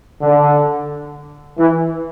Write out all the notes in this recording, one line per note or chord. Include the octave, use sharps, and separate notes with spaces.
D3
E3